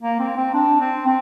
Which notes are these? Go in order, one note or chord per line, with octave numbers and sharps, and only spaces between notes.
A#3
C4
C4
D4
C4
C4